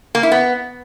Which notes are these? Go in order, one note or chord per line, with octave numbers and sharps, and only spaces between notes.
A#3
E4
B3